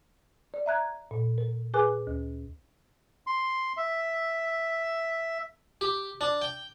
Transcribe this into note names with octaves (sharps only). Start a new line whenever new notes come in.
D5
E5 A#5 F#6 G#6
A#2
A#4
G#4 A#4 B4 G#5 D6 F#6
D2
C6
E5
G4
D4
G5